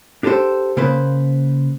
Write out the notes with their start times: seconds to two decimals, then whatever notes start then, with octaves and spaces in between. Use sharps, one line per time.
0.23 D4 G4 A4 B4 C5
0.77 C#3 A#3 B4 C5